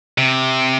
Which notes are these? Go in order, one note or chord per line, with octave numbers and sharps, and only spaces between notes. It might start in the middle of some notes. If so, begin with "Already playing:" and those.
C3